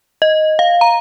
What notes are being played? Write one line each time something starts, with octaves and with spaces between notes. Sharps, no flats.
D#5
F5
A#5